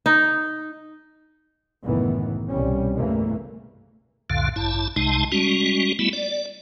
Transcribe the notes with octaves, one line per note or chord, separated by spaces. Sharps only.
D#4
F#1 C#2 A2 D#3 E3 B3
C2 B2 G3 C#4
E2 G2 C#3 E3 A3 A#3
C2 F2 A2 D3 F5
A1 G2 E4 A5
C2 C3 G#3 D#4 A5
G3 G#3 C#4 F#4
G3 A3 B3 E4
D5